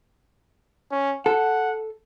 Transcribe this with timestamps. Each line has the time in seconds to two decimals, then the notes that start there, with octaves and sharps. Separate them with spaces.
0.91 C#4
1.26 A4 F#5